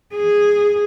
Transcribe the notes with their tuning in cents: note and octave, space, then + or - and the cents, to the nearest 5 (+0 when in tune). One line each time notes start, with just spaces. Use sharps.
G#4 -10